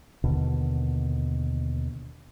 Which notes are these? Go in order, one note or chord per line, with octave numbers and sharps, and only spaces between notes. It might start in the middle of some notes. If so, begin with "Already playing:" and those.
D#2 B2 D3